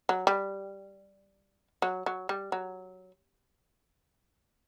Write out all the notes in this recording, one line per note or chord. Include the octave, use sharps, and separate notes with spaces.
F#3
G3
F#3
F#3
G3
F#3